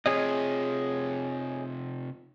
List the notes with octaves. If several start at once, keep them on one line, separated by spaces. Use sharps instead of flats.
C3 F3 G#4 C#5 D#5